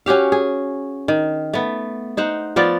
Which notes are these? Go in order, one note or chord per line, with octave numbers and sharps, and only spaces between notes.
C#4 F#4 G4 F5
G#4
D#3
A3 B3
D#4 C5 F#5
F3 B3 F4 D5